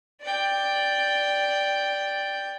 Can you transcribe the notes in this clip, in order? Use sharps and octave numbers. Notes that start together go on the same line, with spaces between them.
D5 G5